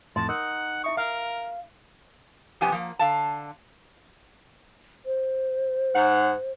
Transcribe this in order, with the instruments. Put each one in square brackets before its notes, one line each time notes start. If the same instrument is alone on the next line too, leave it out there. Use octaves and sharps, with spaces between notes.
[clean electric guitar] F2 A2 [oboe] A5 [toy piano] C6
[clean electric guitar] D#4 [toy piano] A#4 [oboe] F#5
[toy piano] E4 E5 D#6 [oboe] C#6
[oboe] A#4 [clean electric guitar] F5
[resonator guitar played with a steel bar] F2 C3 B3 G4 G#5
F3 A#3
D3 F5 A5
[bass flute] C5
[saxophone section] G#2 F#5